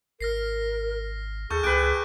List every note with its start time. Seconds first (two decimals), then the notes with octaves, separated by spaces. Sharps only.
0.21 G#1 A#4 F6 A#6 C7
1.50 D#2 G#4 A4 C#6 F6 G6
1.63 C#2 G4 B4 F#6 D7